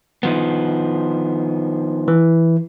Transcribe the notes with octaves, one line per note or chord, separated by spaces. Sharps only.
D#3 F3 B3
E3